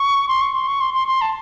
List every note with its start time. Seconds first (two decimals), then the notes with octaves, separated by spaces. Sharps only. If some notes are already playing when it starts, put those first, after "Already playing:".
Already playing: C#6
0.28 C6
0.41 C#6
0.54 C6
0.68 C#6
0.81 C6
0.94 C6
1.08 C6
1.21 A5